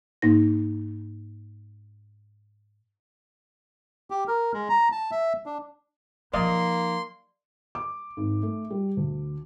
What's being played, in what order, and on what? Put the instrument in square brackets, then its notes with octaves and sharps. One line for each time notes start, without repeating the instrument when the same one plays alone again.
[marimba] G#2 A#3 D#4 A#6
[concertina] G4
A#4
G#3
A#5
A5
E5
D4
[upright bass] F3 D#4 [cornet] A#3 [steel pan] D5 D#5 F5 [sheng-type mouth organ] C6
[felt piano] D6
G#1
A3
G3
D2